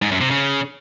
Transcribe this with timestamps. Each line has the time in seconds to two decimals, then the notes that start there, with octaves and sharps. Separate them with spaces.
0.02 G#2
0.11 F#2
0.21 C3
0.30 C#3